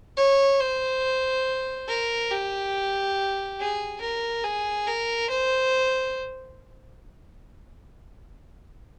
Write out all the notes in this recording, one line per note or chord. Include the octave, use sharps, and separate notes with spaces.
C#5
C5
A#4
G4
G#4
A#4
G#4
A#4
C5